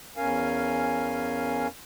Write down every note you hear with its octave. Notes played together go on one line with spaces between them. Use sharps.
E2 C#4 A#4 F5 G#5